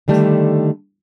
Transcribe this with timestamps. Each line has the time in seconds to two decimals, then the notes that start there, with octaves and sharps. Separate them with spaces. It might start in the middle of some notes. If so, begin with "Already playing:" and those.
0.08 D3 D#3 G3 A3